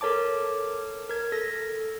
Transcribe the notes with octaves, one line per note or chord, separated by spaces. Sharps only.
A4 A#4 C#5 A5 D6
A#4 G#6
A4 A#6